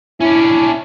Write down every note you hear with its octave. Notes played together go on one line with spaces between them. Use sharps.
C#4 D4 E4